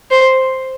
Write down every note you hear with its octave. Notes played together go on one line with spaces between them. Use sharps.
C5